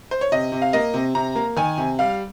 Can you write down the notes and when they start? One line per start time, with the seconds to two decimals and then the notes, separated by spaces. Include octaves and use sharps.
0.11 C5
0.21 C#5
0.32 C3 D#5
0.52 C3
0.62 F5
0.73 A#3 D#5
0.94 C3
1.15 C3 A#5
1.36 A#3
1.56 D#3 G#5
1.78 C3
1.99 G3 F5